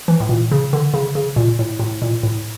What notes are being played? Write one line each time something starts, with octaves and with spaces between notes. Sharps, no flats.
E3
A2
A#2
C#3
D3
C#3
C#3
A#2
A2
A2
A#2
A2